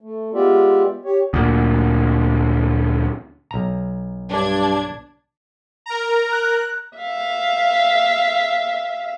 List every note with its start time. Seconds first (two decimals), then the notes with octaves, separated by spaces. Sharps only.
0.01 A3
0.34 G#3 B3 F4 G4 D5 E5
1.05 G4 C#5
1.34 D2 A#2
3.51 B1 A#5
4.31 G2 D4 G#6
5.86 A#4 A#5
6.32 F#6
6.97 E5 F5